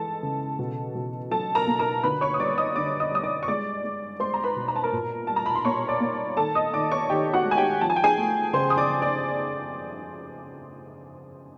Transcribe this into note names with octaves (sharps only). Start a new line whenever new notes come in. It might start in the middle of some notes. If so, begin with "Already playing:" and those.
Already playing: E3 G#3 A4 A5
C#3
B2
B2
F#3 A4 A5
A#4 A#5
A#3
A#4 A#5
D3 B4 B5
C#5 C#6
D#6
G3 D5 D6
D#5 D#6
D3 D5 D6
D#5 D#6
G3 D#6
D5 D6
C#6
G#3 D5 D6
G#3
G#3 C5 C6
A#5
B4 B5
B2
A#5
A5
A#4 A#5
A#2
G3 A5
A#5
B5
C6
A#3 C#5 C#6
D5 D6
A#3
D#3 A4 A5
D#5 D#6
D#3 D5 D6
C#5 C#6
D#3 G4 G5
F#4 F#5
G#3
G#5
G4 G5
F3 A5
G#5
G5
G#4 G#5
A3
C#3 C5 C6
D#6
D5 D6
C#3
D5 D6